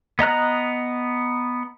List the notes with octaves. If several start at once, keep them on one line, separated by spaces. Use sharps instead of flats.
B3 D#5 A#5 F#6